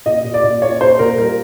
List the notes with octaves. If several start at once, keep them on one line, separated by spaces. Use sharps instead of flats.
A#2 D#5
A#2
D5
A#2
A#2 C#5
A#2 C5
A#2 A#4
G3 A#4